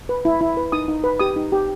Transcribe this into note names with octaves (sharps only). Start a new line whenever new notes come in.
B4
E4
E4
B4
D#4 D#6
D#4
B4
G4 D#6
D#4
G4